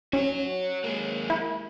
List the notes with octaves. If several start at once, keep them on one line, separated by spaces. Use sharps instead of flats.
C#4 F#4 C#5
G#3 A#3
E4